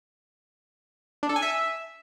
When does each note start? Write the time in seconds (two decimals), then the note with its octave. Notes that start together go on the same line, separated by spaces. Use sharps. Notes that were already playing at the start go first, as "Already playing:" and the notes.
1.23 D4
1.29 A4
1.36 G#5
1.42 E5